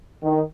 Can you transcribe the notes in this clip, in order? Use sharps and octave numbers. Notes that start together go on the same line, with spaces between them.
D#3